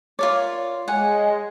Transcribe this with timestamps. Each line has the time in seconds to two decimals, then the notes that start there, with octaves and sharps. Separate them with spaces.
0.19 F4 A#4 C#5 D5
0.88 G#3 C#5 F#5 G#5